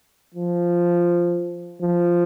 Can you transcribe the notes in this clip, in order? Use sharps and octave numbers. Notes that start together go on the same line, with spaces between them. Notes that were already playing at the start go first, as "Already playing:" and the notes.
F3
F3